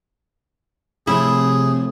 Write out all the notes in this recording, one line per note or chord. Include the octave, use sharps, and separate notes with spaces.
A2 C3 F3 A3 E4 G#4